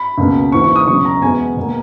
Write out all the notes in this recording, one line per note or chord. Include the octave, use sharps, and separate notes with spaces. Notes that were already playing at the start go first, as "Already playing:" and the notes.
Already playing: B5
C#2 B2 A#3
G#2 E3 A#3 C#6
C#6
D#6
C#2 B2 F#3 C#6
A#5
E2 B2 G#3 B3 G#5
B2 A#3